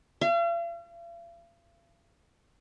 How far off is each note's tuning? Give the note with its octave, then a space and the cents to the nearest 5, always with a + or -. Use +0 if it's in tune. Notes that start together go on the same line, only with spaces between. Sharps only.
F5 -45